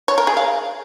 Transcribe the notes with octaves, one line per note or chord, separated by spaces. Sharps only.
C#5
A#4
G#4
F5